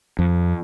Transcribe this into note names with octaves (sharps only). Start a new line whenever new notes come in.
F2